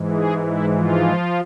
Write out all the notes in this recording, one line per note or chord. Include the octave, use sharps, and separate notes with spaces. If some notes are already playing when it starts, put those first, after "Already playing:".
Already playing: G#2 E3
G#3 G#4
E4
F3 F4